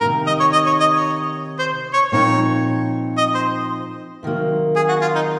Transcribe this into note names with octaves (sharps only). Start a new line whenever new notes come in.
C3 D#3 A#3 D#4 A#4
D#5
C#5
D#5
C#5
D#5
C#5
C5
C#5
A#2 F3 C4 D#4 C#5
D#5
C5
C3 D#3 F#3 A#3
G#4
F#4
F4
D#4